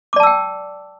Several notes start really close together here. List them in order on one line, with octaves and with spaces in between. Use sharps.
D6 D5 A5 E6 G5